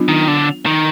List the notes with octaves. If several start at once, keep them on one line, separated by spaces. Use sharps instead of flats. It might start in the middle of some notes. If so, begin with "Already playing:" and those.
Already playing: F#3 B3 D4 F4
D#3
D3
D#3